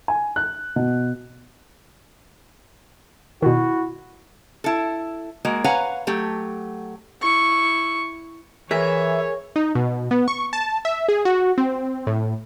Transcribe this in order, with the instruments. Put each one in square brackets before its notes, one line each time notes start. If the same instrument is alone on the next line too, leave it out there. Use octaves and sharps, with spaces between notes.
[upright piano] G#5
F#6
B2
[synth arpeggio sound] B2 D#3 [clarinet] E4 [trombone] F#4
[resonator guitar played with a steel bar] E4 A4
G#3 A#3 F#4
B4 C#5 F5 F#5 G#5 A#5
F#3 A3 G4
[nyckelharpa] E4 C#6
[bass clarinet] E3 [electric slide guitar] G#4 A#4 G#5 [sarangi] C#5 [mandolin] E5
[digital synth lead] D#4
B2
B3
C#6
A5
E5
G#4
F#4
C4
A2